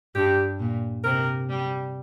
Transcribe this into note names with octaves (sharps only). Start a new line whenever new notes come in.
G2 G4
A#2
C3 A#4
G3